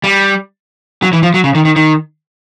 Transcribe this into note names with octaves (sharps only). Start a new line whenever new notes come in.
G3
F#3
E3
F3
F#3
C#3
D#3
D#3
D#3